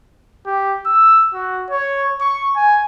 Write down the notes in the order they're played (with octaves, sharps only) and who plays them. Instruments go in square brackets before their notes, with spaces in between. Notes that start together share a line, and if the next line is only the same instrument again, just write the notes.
[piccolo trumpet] G4
E6
F#4
C#5
C#6
G#5